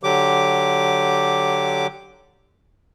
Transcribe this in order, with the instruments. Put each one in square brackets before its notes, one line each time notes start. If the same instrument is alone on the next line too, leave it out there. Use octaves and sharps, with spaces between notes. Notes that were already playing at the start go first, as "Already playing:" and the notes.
[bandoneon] D3 F#3 G4 D6